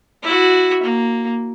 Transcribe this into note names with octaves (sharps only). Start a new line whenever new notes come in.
E4 F#4
A#3